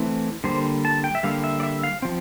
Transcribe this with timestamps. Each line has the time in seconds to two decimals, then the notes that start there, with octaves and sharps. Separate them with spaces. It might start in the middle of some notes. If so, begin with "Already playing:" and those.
Already playing: E3 A3 C4
0.44 D3 G3 A#3 C5
0.85 A5
1.04 G5
1.15 E5
1.23 D3 G3 A#3 F5
1.44 E5
1.60 D5
1.63 E5
1.83 F5
2.02 F3 C4